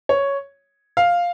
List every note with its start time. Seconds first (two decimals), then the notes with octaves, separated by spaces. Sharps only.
0.09 C#5
0.97 F5